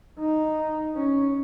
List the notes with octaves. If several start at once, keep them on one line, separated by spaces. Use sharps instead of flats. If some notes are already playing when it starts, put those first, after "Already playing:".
D#4
C#4